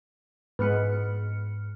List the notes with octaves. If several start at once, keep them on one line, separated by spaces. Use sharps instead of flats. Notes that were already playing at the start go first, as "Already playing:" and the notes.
G#2 G#3 B3 B4 F6 C#7